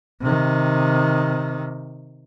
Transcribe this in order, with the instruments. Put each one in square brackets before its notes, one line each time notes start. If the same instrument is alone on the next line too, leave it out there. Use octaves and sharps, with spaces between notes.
[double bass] C3 D#3